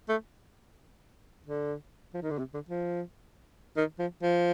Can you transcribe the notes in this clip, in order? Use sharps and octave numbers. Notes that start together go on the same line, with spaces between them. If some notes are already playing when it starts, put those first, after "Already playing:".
A3
D3
F3
D#3
D3
C3
D3
F3
D#3
F3
F3